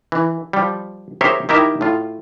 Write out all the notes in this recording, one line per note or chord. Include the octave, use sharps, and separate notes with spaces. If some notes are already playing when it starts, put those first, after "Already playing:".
E3
F3 G3
G4 G#4 A#4 C5 C#5 E5
D#3 E4 G4 A#4 E5
A2 F4